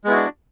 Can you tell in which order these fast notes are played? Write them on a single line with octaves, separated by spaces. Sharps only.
G#3 B3 E4 F#4 D4